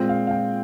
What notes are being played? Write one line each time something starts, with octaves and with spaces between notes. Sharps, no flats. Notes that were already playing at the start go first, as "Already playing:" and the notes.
Already playing: A#2 G#3 C4 F4
F5
F5
G5